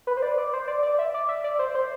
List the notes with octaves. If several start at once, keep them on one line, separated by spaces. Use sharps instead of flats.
B4
C5
D5
D5
C5
D5
D5
E5
D5
E5
D5
C5
C5